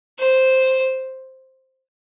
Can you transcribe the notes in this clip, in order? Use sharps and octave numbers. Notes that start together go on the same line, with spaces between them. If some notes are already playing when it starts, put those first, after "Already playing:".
C5